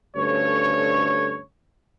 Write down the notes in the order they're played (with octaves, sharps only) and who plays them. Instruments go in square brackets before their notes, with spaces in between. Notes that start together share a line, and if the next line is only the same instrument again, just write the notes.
[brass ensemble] D2 G2 C#4 A4 C#5